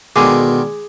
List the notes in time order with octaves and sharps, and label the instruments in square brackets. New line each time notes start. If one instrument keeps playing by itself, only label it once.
[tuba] B2 [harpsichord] D3 D#3 G#3 [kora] G#4 [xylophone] D6